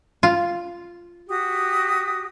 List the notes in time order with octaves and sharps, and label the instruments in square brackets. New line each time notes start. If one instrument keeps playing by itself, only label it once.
[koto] F4
[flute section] F#4 G4 D#6